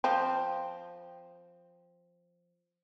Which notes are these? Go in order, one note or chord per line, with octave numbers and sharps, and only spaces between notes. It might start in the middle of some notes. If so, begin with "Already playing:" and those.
F3 C4